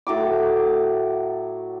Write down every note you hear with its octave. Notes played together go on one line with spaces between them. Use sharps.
A2 F#3 D6